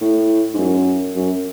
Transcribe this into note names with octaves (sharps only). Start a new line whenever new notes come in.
A2
G#2
F#2
F#2